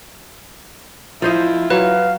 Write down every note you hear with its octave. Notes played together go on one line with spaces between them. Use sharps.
F3 E4 F4 C5 D#5
F#3 B4 F5